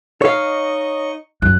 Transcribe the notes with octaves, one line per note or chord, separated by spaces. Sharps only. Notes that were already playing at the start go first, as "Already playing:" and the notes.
D#4 C#5 D#5 F5 C#6
F#2 F#6